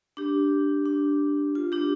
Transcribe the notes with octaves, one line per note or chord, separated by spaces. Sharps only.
D4 G4
D4
F4
D4 G4